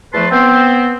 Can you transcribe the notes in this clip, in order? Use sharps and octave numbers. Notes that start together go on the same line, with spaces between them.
E2 F3 A3 B4 A5 C6
B3 C4